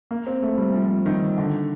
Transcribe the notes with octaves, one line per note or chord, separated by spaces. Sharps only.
A#3
C4
A3
G3
F3
D#3
D3